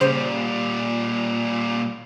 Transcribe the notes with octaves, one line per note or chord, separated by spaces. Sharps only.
A#2 C#3 G3 C5